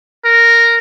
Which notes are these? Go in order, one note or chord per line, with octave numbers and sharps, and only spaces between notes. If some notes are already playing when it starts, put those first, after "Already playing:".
A#4